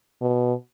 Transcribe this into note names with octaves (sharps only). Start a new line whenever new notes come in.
B2